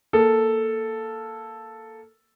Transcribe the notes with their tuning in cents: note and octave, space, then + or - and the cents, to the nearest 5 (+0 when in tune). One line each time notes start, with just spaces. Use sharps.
A#3 +0 A4 +0